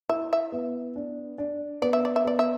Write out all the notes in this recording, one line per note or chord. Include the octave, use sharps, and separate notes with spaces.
E4 E5
E5
B3
D4
D4
B3 D5
E5
D5
E5
B3 D5
E5